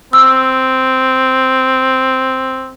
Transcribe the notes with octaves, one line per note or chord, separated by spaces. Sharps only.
C4 E6